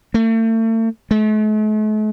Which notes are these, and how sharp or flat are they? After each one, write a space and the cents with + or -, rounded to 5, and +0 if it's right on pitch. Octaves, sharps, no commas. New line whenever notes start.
A3 +40
A3 -45